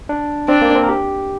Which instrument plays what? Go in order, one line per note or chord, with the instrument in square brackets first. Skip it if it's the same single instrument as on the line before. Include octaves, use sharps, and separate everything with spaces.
[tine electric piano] D4
[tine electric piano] C4 [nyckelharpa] D4
[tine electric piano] A#3
C4
A#4
G4